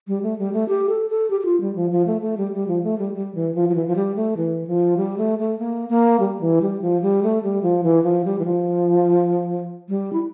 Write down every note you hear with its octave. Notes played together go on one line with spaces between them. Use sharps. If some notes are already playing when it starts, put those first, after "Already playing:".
G3
A3
G3
A3
G4
A4
A4
G4
G4
F4
G3
F3
F3
A3
A3
G3
G3
F3
A3
G3
G3
E3
F3
F3
E3
F3
G3
A3
E3
F3
G3
A3
A3
A#3
A#3
G3
E3
G3
F3
G3
A3
G3
F3
E3
F3
G3
E3
F3
G3
E4